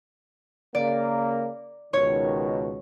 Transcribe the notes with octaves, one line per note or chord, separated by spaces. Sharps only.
C#3 A#3 D5
C#2 B2 D#3 C#5 C#6